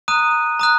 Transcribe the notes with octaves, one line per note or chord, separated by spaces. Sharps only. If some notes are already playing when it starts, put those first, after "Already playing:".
A#5 D#6 F#6 D#7
A#5 D#6 F#6